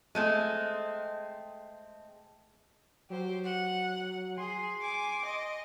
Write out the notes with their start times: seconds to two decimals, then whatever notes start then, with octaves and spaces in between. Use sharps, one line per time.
0.15 G#3 A3 C4
3.10 F#3 G4 C5
3.44 F#5
4.38 G#4 C6
4.81 G#5 D6
5.26 D#5